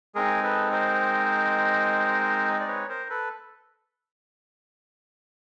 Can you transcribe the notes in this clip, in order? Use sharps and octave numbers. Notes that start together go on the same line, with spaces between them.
G#3 C4 D#4 G#4 A#4
A4 B4
A#4 C5
D5
B4 C#5
A#4 C5
A4 B4